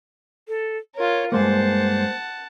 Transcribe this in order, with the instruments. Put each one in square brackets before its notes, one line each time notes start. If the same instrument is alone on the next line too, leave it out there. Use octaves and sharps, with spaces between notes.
[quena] A4
[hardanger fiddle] F4 A#4 [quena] C#5
[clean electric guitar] G2 G#3 A#3 [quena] C5 [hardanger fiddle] F#5 A5